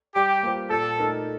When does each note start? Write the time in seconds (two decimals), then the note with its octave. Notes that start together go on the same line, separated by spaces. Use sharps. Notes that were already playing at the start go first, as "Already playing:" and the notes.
0.15 G3 G4
0.43 A#3 F4 C5
0.71 A#2 A4
0.99 A3 D#4 A#4